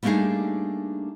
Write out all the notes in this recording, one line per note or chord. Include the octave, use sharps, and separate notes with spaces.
G3 A3 A#3 D4 D#4 G#4